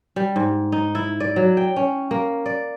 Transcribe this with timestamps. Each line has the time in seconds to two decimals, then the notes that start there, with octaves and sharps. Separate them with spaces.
0.16 G3
0.36 G#2
0.72 D#4
0.95 E4
1.20 D5
1.36 F#3
1.57 G5
1.76 C#4
2.11 A#3
2.46 D5